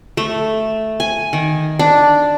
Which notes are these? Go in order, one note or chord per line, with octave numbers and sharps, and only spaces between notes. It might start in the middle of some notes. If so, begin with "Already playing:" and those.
A3
G#5
D#3
D4